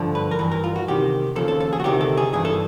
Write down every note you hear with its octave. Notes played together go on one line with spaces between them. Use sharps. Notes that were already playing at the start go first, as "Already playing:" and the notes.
Already playing: G2 D3 F3
B4
A#4
G2 E3 B4
A#4
F4
F#4
E2 C3 D#3 G4
D#2 C#3 F3 A4
A4
A4
G#4
F#4
D2 C3 D#3 G4
A4
G#4
G2 E3 G#4
A4